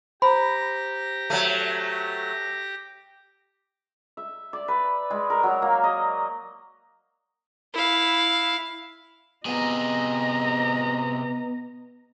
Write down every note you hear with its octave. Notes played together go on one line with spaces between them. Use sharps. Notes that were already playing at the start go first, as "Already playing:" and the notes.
G4 C5 A#5 B5 A#6
F#3 A3
E5
D5
B4
G#3
A#4
F#3
A#3
D#5
E4 F5
C3 B3 G#4 D#5 A#5